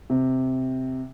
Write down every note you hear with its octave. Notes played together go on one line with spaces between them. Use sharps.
C3